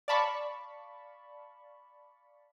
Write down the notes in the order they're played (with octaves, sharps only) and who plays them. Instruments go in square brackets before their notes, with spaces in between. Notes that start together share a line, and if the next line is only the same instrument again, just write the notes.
[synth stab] D5 F5 A5 B5 C#6